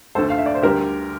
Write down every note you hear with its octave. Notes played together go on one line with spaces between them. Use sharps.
D2 D3 A3 A4 C5
F5
E5
D5
C5
D2 D3 G3 G4 A#4